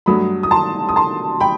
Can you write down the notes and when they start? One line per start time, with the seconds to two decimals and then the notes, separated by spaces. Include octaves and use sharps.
0.06 G2 F#3 A3 B5 D#6
0.43 D#6
0.51 A5 C6
0.89 D#6
0.96 A5 C6
1.40 G5 B5